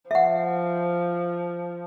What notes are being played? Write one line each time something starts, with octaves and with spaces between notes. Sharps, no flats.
F3 E5 F#5